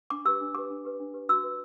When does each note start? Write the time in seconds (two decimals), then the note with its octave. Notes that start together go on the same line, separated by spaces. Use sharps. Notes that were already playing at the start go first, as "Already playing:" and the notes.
0.10 D4 D6
0.25 G4 B4 E6
0.41 D4
0.55 G4 B4 D6
0.70 D4
0.85 G4 B4
1.00 D4
1.14 G4 B4
1.29 F#4 E6
1.44 B4